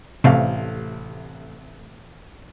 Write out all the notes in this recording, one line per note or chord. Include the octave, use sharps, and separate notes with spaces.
A1 C3 A3 F5